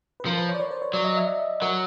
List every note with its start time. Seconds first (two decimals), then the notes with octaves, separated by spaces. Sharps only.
0.20 B4
0.26 F3 A#4
0.38 B4
0.49 C#5
0.54 D5
0.60 C#5
0.71 C5
0.82 C#5
0.93 F#3 D5
1.04 D#5
1.17 E5
1.27 E5
1.39 E5
1.62 F#3 A#4